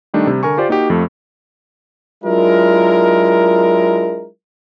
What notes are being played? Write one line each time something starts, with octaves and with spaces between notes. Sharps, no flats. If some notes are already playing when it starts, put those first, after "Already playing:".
D#3 G3 A3 D4 D#4
C3 G3
D3 A#4 G#5 C#6
F4 G4 C5 D5
A#3 D#4 F#4 G4
F2 F3 A3
F#3 G#3 D4 E4 F4 A#4